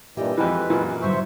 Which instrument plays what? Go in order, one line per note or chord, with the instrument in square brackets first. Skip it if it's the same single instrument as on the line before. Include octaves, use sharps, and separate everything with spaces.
[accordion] G2 A#2 E3 [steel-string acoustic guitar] G4 A4 D#5
[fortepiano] F2 E3 [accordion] G#3 B4
[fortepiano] F#2 A#2 E3
[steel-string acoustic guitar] G2 D3 F#3 [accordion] C5 E5 C#6